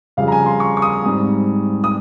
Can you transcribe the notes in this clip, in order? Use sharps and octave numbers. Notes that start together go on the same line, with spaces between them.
F2 C#3 G3 F5
A#5
G#5
C6
C#6
C#6
D#6
G#2 G3 C4
D#6